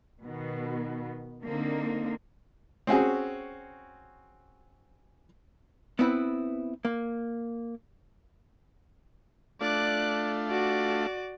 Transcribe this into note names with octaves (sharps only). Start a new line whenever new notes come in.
B2 D#3 B3
D3 A#3 C4 D#4
C4 C#4 F#4 G#4
B3 C4 E4 B4
A#3
A3 D4 F4 D5 F#6
F#4 D5